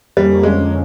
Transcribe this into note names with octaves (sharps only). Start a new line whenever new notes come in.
F2 D3 F3 G3 A#3 C#4
G#3